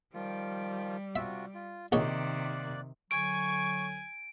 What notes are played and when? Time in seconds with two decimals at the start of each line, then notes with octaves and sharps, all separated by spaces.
0.14 D#3 F3 G3 F4
1.16 C3 F4 F#4 E5
1.55 F4
1.92 A#1 C3 D#3 A#3 D#4 C#5 D5 F#6
3.11 D3 F#3 G#5 C#6 D7